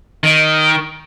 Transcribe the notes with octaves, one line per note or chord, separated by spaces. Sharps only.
D#3